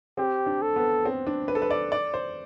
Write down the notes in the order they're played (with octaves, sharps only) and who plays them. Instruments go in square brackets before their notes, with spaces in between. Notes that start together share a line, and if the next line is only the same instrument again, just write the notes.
[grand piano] C4 [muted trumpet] G4
[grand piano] D4
[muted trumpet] A4
[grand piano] B3
C4
D4
B4
A4
B4
D5
D5
C5